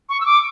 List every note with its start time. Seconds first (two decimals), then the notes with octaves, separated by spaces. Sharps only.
0.09 C#6
0.21 E6
0.26 D6